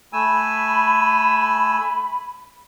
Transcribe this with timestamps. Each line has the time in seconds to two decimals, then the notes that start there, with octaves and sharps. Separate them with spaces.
0.13 A3 G#5 B5 E6